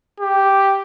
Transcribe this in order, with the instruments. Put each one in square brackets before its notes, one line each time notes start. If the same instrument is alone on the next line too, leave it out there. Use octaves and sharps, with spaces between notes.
[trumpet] G4